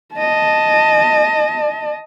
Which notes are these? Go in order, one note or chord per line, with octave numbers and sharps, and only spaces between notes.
D#5 A5